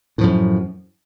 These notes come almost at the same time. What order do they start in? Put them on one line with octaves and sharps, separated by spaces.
A2 F3 F#2